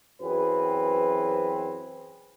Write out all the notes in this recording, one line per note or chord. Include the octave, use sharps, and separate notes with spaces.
F#2 E3 F#3 C4 G#4 B4